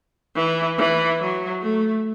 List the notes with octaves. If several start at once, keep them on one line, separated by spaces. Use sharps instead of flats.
E3
E3
F#3
A3